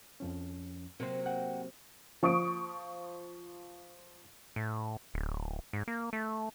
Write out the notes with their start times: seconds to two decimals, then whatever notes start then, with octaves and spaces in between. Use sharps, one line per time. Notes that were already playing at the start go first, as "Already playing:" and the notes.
0.20 F2 F3 C#4
1.00 C3 F#3 A#3 C4 C5
1.26 F#5 G5
2.23 F3 C#6 D#6 D7
4.56 A2
5.14 D1
5.73 G#2
5.88 A#3
6.13 A3